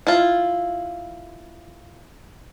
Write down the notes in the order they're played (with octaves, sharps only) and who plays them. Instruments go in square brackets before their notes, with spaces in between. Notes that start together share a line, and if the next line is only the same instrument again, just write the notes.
[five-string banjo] E4 F4